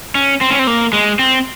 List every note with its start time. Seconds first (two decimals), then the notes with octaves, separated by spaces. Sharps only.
0.15 C#4
0.41 C4
0.51 C#4
0.59 C4
0.67 A#3
0.93 G#3
1.19 C4